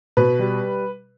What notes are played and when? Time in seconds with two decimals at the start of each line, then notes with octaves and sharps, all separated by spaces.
0.17 B2 B4
0.39 G3